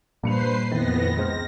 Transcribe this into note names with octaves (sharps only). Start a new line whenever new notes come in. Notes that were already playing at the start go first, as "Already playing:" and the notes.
G2 A#2 B4 C5 C7 C#7 F7
F#1 F2 D#3 B3 A6 A#6
C#2 C5 F6 A#6